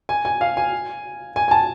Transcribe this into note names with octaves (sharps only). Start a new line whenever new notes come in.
G#5
G#5
F5
G#5
G#5
G#5
A5